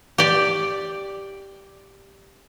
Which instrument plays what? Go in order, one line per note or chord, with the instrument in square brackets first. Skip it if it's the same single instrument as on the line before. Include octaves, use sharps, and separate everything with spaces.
[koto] G4 D5